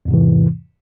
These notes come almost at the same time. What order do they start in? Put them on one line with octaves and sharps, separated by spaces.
E2 G#2 C3 E3